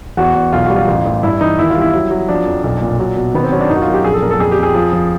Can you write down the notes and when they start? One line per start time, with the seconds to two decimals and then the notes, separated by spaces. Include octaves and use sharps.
0.17 E2 F#4
0.35 E2
0.53 B1 F4
0.65 F#4
0.70 G3
0.76 F4
0.88 A1 F4
1.05 A1
1.23 G2 E4
1.41 E3 D#4
1.58 D#2 E4
1.70 F4
1.76 G3
1.82 E4
1.94 F#3
2.11 F#3
2.29 F3 D4
2.46 F2
2.64 B1
2.81 A#2
2.99 F#3
3.17 B2
3.34 D#3 B3
3.43 C4
3.52 F#3 C#4
3.61 D4
3.69 F#2 D#4
3.76 F#4
3.82 F4
3.87 F#2
3.93 G4
4.04 A#1 G#4
4.13 A4
4.22 A#2 A#4
4.31 A4
4.39 F2 G#4
4.51 G4
4.58 F2
4.63 G#4
4.75 F3
4.93 F3